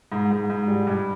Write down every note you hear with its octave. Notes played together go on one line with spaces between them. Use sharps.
G#2
G#2
G#2
G3
G2